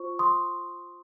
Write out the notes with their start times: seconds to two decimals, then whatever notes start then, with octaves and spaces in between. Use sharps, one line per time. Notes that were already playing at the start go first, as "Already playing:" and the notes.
Already playing: F4 C5 C#6
0.19 C6 D#6